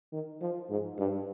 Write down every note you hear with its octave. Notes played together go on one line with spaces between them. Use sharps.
D#3
F3
G#2
G2